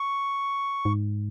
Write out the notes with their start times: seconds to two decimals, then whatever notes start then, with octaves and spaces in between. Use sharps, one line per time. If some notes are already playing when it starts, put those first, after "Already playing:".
Already playing: C#6
0.85 G#2